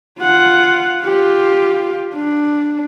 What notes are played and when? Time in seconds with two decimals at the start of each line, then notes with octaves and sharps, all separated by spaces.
0.19 F4 F#5
1.04 F4 G4
2.14 D4